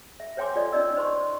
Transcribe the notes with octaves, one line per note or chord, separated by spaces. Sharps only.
E5
C5 C#5 G5 G#5 C6 D6
F4 A4 D5 D#5
C#4 D#4 D5 D#5 E6
C5 C6 C#6